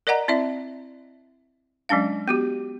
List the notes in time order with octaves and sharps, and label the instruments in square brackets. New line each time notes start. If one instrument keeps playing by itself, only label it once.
[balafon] A#4 D5 D#5 F#5 A#5
C4 E4 D5 E5
F#3 G#3 C#4 D4 F5
B3 F#4 G4